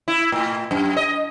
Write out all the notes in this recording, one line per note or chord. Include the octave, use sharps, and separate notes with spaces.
E4
A2
F#2
D#5